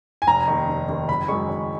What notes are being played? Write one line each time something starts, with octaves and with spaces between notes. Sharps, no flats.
G#5
F1 A#5
D#2 D#3
F1
D#2 D#3
F#1 B5
F#2 D#3 G#3 C#6
F#1